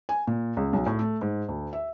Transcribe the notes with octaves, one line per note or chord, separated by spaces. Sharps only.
G#5
A#2
C#2
B1
A2
A3
G#2
D2
E5